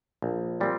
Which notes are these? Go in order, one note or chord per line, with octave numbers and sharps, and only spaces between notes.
A#1
A#2 G3 C4